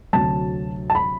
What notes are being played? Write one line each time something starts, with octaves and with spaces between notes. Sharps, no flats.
D2 C3 F#3 A5
A5
B5